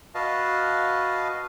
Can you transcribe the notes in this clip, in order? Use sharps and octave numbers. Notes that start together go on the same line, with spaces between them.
F#4 B4 D#5 F5 A5